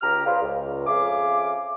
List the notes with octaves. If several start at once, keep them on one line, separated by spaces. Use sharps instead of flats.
C#2 G4 A#5 F6
F4 G#4 B4 C5 D5 F5
C#2
F2 C#4 G#4 E5 F5 D6